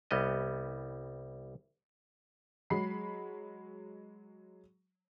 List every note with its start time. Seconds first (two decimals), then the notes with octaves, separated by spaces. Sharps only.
0.11 C2 G3 B3 D#5
2.70 F#3 G#3 B5 C7